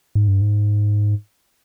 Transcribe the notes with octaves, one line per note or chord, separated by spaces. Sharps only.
G#2
G2
G#2